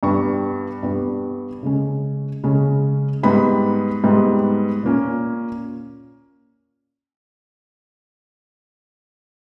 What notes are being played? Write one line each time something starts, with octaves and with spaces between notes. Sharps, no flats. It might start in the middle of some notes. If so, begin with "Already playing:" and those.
G2 G3 B3 C#6
G2 G3 B3
C#3 G#3 C#4
C#3 G#3 C#4
G#2 G3 B3 B5
G#2 G3 B3
A#2 A#3 C#4